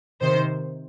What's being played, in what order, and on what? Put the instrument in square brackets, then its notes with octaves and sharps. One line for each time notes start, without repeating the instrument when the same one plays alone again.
[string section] C3 D#3 C5